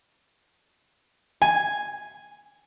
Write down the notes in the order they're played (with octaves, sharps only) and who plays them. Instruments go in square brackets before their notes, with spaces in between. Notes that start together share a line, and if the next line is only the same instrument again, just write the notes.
[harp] G#5